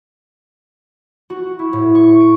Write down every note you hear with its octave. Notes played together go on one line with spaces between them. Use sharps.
F#4
E4
A2
C#6
D7